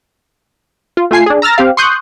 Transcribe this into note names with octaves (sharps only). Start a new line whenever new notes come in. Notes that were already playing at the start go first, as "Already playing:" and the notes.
F4
A3 F4 G#5 C7
D4 G#4
A#5 E6 F6 A6 A#6
C4 G4 F5
C6 C#6 D#6 F#6 G6